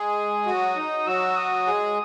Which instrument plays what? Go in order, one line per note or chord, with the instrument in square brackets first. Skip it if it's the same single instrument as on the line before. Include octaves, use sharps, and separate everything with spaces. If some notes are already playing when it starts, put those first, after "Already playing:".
Already playing: [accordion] G#3 G#4 [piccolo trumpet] D#6
[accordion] F#3 F#4
D#4
[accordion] F#3 F#4 [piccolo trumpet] E6
[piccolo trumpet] D#6
[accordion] G#3 G#4